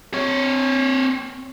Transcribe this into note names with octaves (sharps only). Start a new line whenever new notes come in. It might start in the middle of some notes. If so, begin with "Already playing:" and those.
C4 C#5